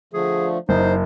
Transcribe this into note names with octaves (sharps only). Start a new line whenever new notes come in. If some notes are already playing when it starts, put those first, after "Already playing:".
D3 F3 A3 G#4
F#1 D#4 C5